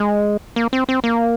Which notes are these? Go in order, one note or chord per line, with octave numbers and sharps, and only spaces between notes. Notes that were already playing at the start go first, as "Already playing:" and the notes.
Already playing: G#3
A#3
C4
C4
A#3